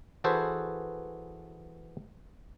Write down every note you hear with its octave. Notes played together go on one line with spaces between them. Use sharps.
E3 F#4 G#4 A4 B4 C5